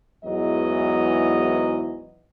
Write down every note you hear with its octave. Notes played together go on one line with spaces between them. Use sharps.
E2 G#2 E3 F#3 D#5